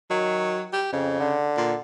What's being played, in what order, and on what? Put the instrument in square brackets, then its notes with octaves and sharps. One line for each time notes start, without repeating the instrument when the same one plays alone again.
[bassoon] D#3 [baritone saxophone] F#3
[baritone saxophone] G4
[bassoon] F2 [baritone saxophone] C#3
[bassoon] D3
[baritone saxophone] A#2